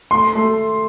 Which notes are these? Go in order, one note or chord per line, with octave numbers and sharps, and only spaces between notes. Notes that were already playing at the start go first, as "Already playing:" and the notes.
A3 C6
A3